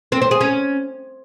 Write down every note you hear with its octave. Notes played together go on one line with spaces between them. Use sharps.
C4
C5
G#4
C#4